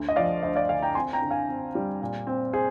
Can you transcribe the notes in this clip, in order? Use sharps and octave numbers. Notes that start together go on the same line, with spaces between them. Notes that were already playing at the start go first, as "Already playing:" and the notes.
Already playing: D2
D#5
F3 D5 F5
D2 C5 D#5
D5 F5
D3 F5 G#5
G5 A#5
C4 G#5 C6
G5 A#5
D3
F5 G#5
C4
G3
A#2
C4
G#4 C5